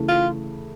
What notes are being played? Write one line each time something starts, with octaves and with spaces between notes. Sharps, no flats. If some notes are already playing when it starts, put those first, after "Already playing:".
Already playing: C#3 E3 A3
F4